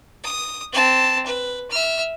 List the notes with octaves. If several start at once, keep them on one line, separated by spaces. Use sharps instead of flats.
D#6
C4 A5
B4
E5 F6